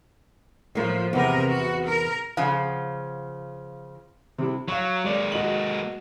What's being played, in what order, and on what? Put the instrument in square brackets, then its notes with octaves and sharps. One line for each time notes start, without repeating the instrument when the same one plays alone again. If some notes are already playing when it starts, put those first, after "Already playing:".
[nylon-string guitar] A2 A#3 [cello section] F3
[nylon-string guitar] E2 B3 [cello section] C3 A#4
[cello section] F#4
A#4
[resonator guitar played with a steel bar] C#3 F3 [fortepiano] F5 F#5
[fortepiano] C3 G3 E4
[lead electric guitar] F#3 [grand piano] C#5 F5
[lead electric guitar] G#3 A#3 [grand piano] D5
[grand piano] F#4 D#5 F#7